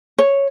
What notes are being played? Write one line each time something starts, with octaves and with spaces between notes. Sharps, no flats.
C#5